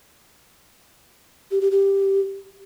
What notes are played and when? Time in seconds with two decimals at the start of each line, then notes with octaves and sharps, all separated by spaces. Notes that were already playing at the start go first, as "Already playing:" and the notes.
1.51 G4
1.61 G4
1.71 G4